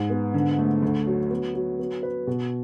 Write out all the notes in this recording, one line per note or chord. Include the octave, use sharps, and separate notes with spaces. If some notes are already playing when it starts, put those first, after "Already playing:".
Already playing: G#2
B3
D3
A3
D2
F#3
B3
F#3
B3
B4
B2